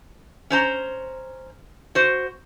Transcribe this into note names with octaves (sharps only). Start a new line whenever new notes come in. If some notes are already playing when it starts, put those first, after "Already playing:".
C#4 C5 A#5
F#4 C5